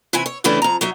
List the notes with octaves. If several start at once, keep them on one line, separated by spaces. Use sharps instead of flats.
C3 E3 E4 G#5
C#5
A2 C#3 E3 A3 C#4 D4
F2 A#5
F#3 D#4 E5